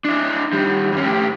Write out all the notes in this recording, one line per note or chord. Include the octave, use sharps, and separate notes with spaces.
D4 E4
D#3 G3
G2 C#4
A2 G4